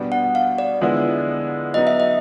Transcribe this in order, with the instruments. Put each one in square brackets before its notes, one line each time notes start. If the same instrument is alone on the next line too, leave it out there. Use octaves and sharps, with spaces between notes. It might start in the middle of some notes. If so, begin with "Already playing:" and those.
Already playing: [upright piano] B2 G3 B3 D4 F#4
[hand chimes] F#5
F5
D5
[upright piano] D3 F3 G#3 B3 E4
[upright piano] F#3 B3 D#4 [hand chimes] D#5
[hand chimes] E5
D#5